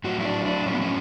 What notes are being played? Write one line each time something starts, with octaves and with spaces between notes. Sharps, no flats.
A2 F#3 F#4
E4
D4
D4
A2 F#3 C#4
B3
C#4